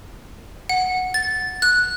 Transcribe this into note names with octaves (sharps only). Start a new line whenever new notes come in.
F#5
A6
F#6